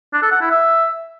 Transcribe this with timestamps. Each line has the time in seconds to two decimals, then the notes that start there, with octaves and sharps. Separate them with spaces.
0.13 D4
0.22 A4
0.32 F#5
0.41 E4
0.50 E5